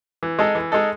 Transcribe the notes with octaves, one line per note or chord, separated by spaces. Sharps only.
E3
G#3 D#4 A4
E3
G#3 D#4 A4